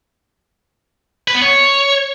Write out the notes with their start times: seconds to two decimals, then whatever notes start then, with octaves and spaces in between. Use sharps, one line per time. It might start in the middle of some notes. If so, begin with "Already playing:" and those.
1.28 B4
1.35 B3
1.42 C#5